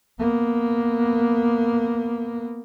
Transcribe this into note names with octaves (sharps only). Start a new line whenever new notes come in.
A#3 B3